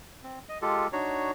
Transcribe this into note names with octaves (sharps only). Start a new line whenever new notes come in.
C4
D#5
G#3 F4 G4 A4
D4 D#4 F#4 C#5